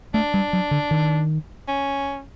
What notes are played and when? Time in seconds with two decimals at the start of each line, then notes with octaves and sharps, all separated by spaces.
0.14 A3 D4
0.34 G3
0.53 F#3
0.71 D3
0.91 D#3
1.68 C#4